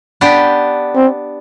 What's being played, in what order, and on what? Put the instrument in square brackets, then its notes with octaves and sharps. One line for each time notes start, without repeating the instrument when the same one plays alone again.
[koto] B3 D4 G4
[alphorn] C4